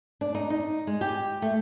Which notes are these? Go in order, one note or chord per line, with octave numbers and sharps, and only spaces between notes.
D4
D#4
D#4
G#3
G4
A3